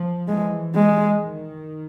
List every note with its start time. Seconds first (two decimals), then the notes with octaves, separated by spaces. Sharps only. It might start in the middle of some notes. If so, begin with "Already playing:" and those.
Already playing: F3
0.28 E3 G#3
0.75 G#3
1.22 D#3